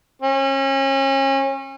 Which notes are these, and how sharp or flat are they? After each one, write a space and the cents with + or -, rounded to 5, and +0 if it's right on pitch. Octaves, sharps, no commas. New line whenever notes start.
C#4 -35